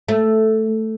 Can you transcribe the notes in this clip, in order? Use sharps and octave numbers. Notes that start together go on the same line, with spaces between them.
A3